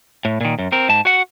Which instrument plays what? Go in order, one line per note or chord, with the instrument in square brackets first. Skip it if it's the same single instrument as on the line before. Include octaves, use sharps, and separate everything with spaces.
[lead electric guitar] A2
A#2 D#3
F#2
C4 A#4
G#2 A5
F#4 F#5